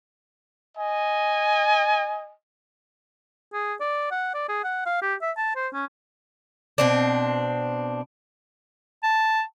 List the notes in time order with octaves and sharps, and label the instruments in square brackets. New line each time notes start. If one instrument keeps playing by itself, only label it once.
[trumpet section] D#5 G#5
[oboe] G#4
D5
F#5
D5
G#4
F#5
F5
G4
E5
A5
C5
C#4
[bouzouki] B2 C4 D4
[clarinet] A5